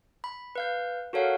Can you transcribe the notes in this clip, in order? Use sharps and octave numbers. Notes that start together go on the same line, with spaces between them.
B5
B4 F5 G6
F#4 A4 A#4 C#5 F5 F#5